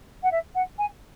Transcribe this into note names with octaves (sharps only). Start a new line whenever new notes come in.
F#5
E5
F#5
G#5